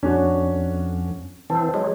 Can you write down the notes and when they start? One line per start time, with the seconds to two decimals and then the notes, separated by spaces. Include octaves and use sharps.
0.03 F2 C#4 D4 F#4
1.50 E3 C4 A5
1.74 F#3 G#3